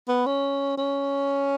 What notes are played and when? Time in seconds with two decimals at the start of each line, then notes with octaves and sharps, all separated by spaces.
0.08 B3
0.26 C#4
0.77 C#4